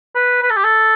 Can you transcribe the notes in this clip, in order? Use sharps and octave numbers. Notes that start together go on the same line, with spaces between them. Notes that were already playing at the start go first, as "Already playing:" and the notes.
B4
B4
A4
G4
A4